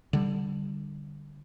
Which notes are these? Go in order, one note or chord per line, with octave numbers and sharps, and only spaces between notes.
D3 G3